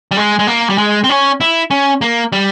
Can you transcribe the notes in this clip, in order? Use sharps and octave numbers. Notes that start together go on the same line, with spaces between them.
G3
G#3
G#3
A#3
G3
G#3
C4
C#4
E4
C#4
A#3
G3